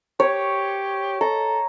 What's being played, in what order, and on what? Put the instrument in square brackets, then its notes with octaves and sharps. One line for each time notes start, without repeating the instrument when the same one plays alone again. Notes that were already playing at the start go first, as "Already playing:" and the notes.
[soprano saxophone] G4 [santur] C#5
[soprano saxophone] A4 [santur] A#5